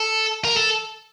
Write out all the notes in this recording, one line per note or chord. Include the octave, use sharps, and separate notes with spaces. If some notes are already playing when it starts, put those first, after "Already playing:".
Already playing: A4
A#4
A4